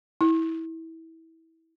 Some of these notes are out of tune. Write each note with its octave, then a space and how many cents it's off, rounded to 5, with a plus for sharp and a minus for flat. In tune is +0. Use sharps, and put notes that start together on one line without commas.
E4 -20